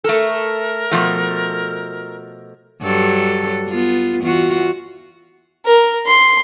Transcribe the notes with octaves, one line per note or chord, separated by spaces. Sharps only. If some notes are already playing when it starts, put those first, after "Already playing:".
A3 A4 A#4
B2 F3 A3
G2 F#3 A4
B3 F4
E2 F4 F#4
A#4
C6